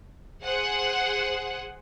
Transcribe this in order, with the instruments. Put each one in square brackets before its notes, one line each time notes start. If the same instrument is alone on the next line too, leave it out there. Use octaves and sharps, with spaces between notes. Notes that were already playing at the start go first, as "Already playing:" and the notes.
[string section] G#4 C5 F#5